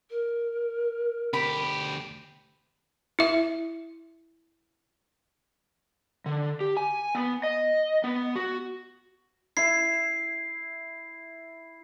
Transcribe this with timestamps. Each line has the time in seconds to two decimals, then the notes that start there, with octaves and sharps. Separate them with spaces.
0.10 A#4
1.33 D2 G4 B5
3.19 E4 E5
6.26 D3
6.61 G4
6.77 G#5
7.15 B3
7.43 D#5
8.04 B3
8.36 F#4
9.57 E4 C7